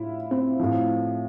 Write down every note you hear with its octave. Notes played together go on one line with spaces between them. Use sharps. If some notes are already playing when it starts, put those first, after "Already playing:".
Already playing: A2 E4 F4
C4
A2 F3